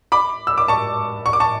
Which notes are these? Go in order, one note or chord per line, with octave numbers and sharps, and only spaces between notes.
B5 D6
E6
D6
A5 C#6
C#6
D6
A5 C#6